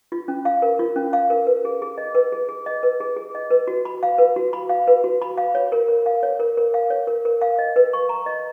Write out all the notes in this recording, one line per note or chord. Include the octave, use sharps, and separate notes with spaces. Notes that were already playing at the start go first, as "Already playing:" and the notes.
F4
C#4
F5
A#4
F4
C#4
F5
A#4
B4
G#4
G#4
D#5
B4
G#4
G#4
D#5
B4
G#4
G#4
D#5
B4
F#4
B5
F5
B4
F#4
B5
F5
B4
F#4
B5
F5
C#5
A#4
A#4
F5
C#5
A#4
A#4
F5
C#5
A#4
A#4
F5
D#5
B4
C#6
A#5
D#5